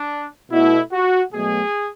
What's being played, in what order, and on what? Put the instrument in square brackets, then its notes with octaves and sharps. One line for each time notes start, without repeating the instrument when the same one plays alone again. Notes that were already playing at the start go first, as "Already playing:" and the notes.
Already playing: [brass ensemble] D4
B2 A3 E4
F#4
B2 F#3 A3 G#4